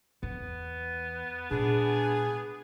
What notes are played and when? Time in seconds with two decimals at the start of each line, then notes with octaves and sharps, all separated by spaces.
0.23 E2 B3
1.51 A#2 G#3 D4 G#4